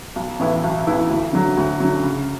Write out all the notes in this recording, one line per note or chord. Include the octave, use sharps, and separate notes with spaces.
B1
A2 E3 B3 E4
B1
A2 E3 B3 E4
D2
D3 F#3
D2
D3 F#3
C#3